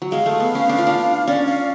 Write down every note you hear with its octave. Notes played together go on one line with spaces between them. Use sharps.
F#3
G#3 F5
A3
B3
C#4
D4
F4
D4
C#4 D5
F5